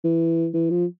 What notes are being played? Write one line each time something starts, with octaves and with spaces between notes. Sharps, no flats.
E3
E3
F3